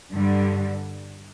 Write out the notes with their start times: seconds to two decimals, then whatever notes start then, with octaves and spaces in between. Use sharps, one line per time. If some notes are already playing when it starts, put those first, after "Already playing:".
0.11 G2 D3 G3